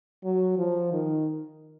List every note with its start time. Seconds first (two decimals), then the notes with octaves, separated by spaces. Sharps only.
0.24 F#3
0.58 F3
0.93 D#3